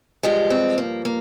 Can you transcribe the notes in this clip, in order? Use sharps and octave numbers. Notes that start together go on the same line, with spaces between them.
G2 F3 G#3 G4
C4
A#3
A#3